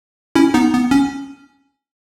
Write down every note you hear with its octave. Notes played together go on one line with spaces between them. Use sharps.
C#4 E4
B3 D#4
B3
C#4